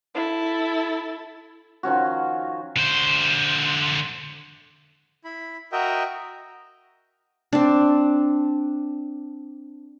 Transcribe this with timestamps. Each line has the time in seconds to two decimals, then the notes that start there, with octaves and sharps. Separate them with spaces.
0.15 E4 A4
1.83 D#3 F3 C#4 F#4
2.77 D3 C5
5.25 E4 B5
5.72 F#4 A#4 D#5 E5 G5
7.53 C4 D4